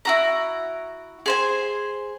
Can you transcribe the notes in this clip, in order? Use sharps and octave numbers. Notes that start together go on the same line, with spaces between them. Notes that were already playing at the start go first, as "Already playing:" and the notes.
E4 F#4 A#5
G#4 C5 G#5